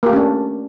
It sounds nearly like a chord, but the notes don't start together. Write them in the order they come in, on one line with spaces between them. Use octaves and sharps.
A#3 G4 A3 C#4 D4